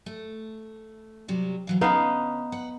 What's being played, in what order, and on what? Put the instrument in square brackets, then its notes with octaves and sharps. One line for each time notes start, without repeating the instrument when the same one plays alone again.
[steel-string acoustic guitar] A3
C3 F#3 G3
E3 F#3 F5
[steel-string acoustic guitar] D2 C#4 [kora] B3 D#4 F5
[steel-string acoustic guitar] B4 F#5